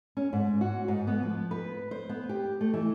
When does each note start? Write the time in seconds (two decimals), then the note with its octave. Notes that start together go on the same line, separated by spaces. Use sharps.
0.17 C#4
0.33 G#2
0.61 F#4
0.88 G#2
1.07 B3
1.23 F3
1.51 B4
1.91 C5
2.09 B3
2.29 G4
2.61 A3
2.74 E3